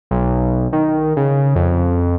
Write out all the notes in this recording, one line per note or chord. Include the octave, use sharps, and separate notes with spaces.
B1
D#3
C#3
F2